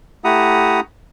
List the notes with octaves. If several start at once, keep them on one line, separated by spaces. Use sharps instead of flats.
A3 E4 G4 F#5 A#5 D#6